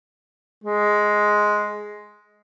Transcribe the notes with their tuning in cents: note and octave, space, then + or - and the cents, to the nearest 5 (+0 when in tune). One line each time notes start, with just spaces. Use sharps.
G#3 +5